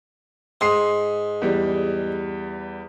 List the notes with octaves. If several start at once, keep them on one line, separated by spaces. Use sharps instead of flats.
G#2 C6 D#6 C7
E2 G3